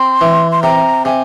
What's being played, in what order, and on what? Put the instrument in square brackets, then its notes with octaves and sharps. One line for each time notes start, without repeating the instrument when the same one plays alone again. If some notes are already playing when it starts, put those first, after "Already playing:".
Already playing: [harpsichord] C4 [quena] C6
[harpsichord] E3
[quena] C6
[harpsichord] C3 [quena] A#5
[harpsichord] C3 [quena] G#5